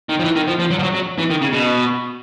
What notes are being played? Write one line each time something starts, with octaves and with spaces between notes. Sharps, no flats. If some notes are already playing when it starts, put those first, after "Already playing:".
D#3
F3
E3
D#3
F3
F3
F#3
F3
F#3
F#3
E3
D#3
C#3
B2